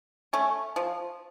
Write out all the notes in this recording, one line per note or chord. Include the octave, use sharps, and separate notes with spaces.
A3 C#4
F3